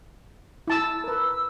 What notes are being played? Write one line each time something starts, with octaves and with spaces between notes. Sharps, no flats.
E4 A5 E6
A#4 B4 E6